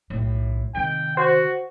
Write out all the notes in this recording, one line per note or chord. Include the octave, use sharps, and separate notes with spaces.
B1 A2
C3 D#3 G5
F#4 C5